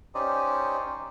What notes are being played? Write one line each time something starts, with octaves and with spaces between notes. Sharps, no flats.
C#4 D#4 G4 C5 D5 D#5